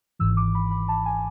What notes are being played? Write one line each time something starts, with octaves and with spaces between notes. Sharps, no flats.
G#1 G#2 E3 E6
D6
B5
B5
A5
G#5